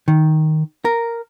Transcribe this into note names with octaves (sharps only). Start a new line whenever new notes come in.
D#3
A#4